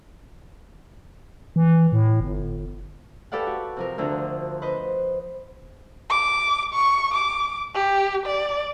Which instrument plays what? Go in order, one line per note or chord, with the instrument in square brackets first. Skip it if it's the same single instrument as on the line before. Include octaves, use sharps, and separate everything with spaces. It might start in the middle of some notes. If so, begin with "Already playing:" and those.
[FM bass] E3
A2
G1
[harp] G4 A4 B4 D5 F5 F#5
F#4
C3 F3 A#4
D2 D3 F3
B4 C5 D#5
[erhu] D6
C#6
D6
G4
D5